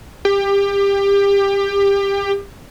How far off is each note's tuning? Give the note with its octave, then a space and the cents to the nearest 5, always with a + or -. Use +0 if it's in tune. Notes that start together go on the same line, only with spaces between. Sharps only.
G4 +25